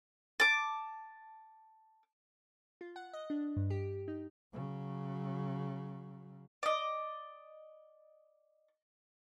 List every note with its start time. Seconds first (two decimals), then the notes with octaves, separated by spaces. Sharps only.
0.40 A5 D6
2.81 F4
2.96 F#5
3.13 D#5
3.30 D4
3.57 G2
3.70 G4
4.08 D#4
4.53 C#3 F#3
6.63 D5 D#5